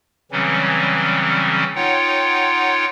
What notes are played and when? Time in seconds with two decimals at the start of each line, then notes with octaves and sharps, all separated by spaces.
0.32 C#3 E3 F#3 G3 C4 C#4
1.75 D#4 F4 C#5 F#5 G5